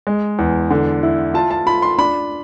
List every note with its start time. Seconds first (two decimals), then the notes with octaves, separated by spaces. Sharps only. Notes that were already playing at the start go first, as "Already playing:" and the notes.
0.07 G#3
0.39 E2
0.71 D3
1.03 E4
1.34 F4 A5
1.51 A5
1.66 F4 B5
1.82 C6
1.98 D4 B5